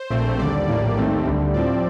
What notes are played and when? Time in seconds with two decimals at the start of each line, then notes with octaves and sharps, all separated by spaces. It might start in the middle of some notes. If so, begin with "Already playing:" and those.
Already playing: C5
0.10 A#1 A#2 A3 C4
0.39 D#2 D3 G3 D5
0.68 A#1 A2 G3 A#3
0.97 D#2 D#3 A3 C4
1.25 D2 D3 G3
1.54 A2 F3 C4 D5